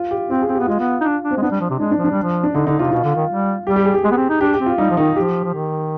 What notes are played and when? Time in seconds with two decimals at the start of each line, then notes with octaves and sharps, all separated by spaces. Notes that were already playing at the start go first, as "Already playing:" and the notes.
Already playing: F4
0.11 G4
0.30 C4 F4
0.42 G#4
0.49 C4
0.55 B3 G4
0.67 G#3 F4
0.79 B3
1.01 D#4
1.04 D4
1.24 D4
1.31 C4
1.37 G#3
1.42 B3 D4
1.51 G3
1.61 F3
1.70 C3
1.79 G#3 D4
1.91 D4
1.98 F3
2.04 D4
2.11 G3
2.23 F3
2.43 D4
2.55 D3 D#4
2.66 D3 D#4
2.79 C3 F4
2.92 B2 F4
3.04 D3
3.16 D#3
3.30 G3
3.66 G3 G4
3.76 G4
3.85 G#4
3.94 G4
4.04 G#3 G#4
4.12 B3
4.17 C4
4.29 D#4
4.41 D4 G4
4.54 G4
4.60 C4
4.66 F4
4.78 G3 D#4
4.91 F3
4.97 D#3 D#4
5.16 F3 G4
5.44 F3
5.54 D#3